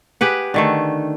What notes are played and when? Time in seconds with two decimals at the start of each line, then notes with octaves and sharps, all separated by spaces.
0.21 G4 G#4 B4 F#5
0.54 D3 D#3 A3